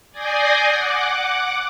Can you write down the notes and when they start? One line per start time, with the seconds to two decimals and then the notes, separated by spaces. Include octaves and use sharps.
0.12 D5 G#5 D#6 G6 A#6 C7
0.65 F#5 D6